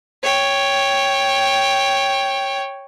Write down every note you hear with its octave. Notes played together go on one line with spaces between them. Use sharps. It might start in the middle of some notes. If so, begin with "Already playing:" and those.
C#5 G5